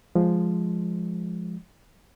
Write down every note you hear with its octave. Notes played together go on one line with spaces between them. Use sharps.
F3 G#3